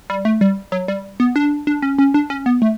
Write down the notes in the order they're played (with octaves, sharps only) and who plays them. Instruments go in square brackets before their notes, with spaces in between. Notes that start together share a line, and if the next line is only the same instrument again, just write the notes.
[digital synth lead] G3
A3
G3
F#3
G3
B3
D4
D4
C#4
C#4
D4
C#4
B3
A3